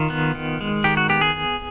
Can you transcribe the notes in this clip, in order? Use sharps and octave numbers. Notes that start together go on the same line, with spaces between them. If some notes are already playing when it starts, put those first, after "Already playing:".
Already playing: D#3 F4
B3
D#3
G#3
D#3 G4
F#4
B3 G4
G#4